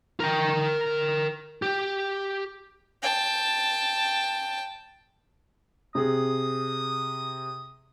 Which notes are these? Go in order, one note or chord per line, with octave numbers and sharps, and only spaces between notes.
A#4 G5
G4
G5 A5
C3 G#4 D#6